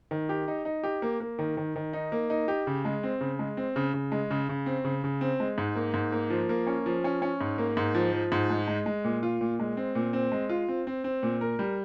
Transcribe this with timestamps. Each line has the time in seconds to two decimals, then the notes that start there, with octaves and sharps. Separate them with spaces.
0.11 D#3
0.29 G4
0.48 D#4
0.65 D#4
0.83 G4
1.02 A#3
1.20 A#3
1.39 D#3
1.57 D#3
1.76 D#3
1.93 D#4
2.12 A#3
2.30 D#4
2.48 G4
2.67 C#3
2.85 G#3
3.03 C4
3.21 C#3
3.39 G#3
3.57 C4
3.76 C#3
3.94 C#3
4.12 G#3
4.31 C#3
4.49 C#3
4.66 C4
4.84 C#3
5.04 C#3
5.21 C4
5.40 G#3
5.58 G#2
5.76 A#3
5.94 G#2
6.12 A#3
6.30 F3
6.49 A#3
6.67 C#4
6.86 F3
7.04 C#4
7.22 C#4
7.41 G#2
7.58 A#3
7.77 G#2
7.95 F3
8.13 F3
8.32 G#2
8.50 G#3
8.68 G#3
8.86 G#3
9.04 A#2
9.23 F4
9.41 A#2
9.60 G#3
9.77 C4
9.95 A#2
10.13 C4
10.32 G#3
10.49 F4
10.68 C4
10.87 C4
11.04 C4
11.23 A#2
11.41 A#4
11.59 G3